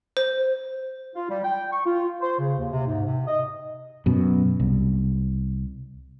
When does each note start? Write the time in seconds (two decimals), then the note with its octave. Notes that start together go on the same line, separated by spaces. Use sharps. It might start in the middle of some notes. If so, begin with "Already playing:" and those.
0.17 C5
1.15 F4
1.30 G3
1.44 G5
1.72 C#6
1.85 F4
2.21 C5
2.38 C#3
2.58 D#2
2.72 C3
2.87 G#2
3.05 C3
3.27 D#5
4.06 F#2 B2
4.60 C2